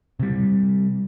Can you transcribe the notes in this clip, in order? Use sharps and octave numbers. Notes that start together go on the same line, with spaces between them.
C3 G3